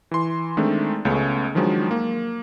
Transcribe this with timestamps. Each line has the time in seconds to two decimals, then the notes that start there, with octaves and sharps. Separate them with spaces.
0.11 E3 C6
0.57 D#3 G#3 A3 C4 D4
1.05 C#2 C#3 A3 B3 C#4 C#5
1.55 D#3 F3 F#3 G#3 D4
1.91 A#3